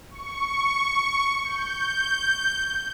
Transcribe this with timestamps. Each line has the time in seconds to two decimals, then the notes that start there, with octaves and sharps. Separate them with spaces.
0.10 C#6
1.45 G6